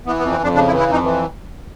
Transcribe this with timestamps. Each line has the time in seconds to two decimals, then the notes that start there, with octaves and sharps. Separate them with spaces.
0.06 E3 B3
0.19 B3
0.22 F2
0.32 C4
0.39 F2 D4
0.54 C#3 D4
0.67 E4
0.71 E3
0.79 E4
0.88 F2 D#4
1.03 E3